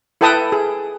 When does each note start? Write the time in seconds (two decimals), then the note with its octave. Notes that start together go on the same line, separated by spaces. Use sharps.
0.21 E4 A4 B4 G5 A5 D#6
0.52 G#4